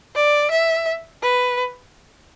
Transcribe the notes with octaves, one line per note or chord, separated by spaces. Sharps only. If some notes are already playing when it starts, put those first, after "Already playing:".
D5
E5
B4